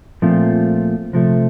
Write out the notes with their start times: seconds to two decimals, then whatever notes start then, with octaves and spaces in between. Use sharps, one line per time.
0.22 A#2 F3 A3 C4 F4
1.13 C3 F3 A3